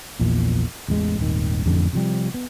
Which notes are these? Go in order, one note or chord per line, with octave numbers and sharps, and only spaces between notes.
A#1 E2 A#2
A1 E2 G#3
D#1 G#1 D#3
A1 F2 D3
C3 F3 G3
B3